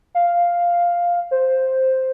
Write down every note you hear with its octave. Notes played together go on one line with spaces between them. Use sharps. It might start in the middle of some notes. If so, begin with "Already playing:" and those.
F5
C5